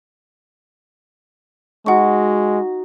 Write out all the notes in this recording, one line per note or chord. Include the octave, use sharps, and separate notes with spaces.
G#3 D#4 F#4 F#5 C#6